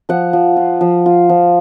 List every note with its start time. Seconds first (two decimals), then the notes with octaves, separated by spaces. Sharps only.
0.09 F3 F#5
0.33 F3
0.56 F4
0.81 F3
1.06 F4
1.29 F3